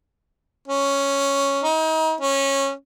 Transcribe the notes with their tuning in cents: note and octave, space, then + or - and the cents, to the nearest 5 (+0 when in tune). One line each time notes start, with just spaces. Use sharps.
C#4 +0
D#4 +35
C#4 -15